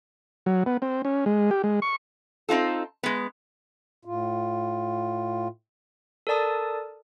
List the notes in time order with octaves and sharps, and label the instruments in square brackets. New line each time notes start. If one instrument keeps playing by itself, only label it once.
[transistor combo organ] F#3
B3
C4
C#4
G#3
G4
G#3
C#6
[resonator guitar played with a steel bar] C4 D#4 F4 A4
G#3 B3
[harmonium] A2 F4
[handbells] A4 A#4 D5 A5 D#6